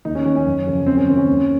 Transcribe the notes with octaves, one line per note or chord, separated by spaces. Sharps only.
D#2 D#4
C#4
D#3 C#4
C#4
F#2
C#3 F3
F#2 C4
C#4
D#3 C4
C#4
D#2